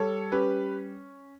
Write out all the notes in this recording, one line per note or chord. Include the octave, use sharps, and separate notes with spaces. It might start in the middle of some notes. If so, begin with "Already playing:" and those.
Already playing: G3 A4 C#5
C#4 G4 B4